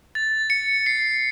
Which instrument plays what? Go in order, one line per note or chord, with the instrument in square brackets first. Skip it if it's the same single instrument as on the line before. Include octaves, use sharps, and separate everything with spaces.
[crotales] A6
C#7
C7